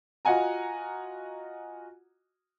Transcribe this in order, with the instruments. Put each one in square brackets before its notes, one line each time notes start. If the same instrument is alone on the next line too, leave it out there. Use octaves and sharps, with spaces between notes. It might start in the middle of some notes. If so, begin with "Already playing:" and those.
[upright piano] F4 F#4 D#5 F#5 G#5 A#5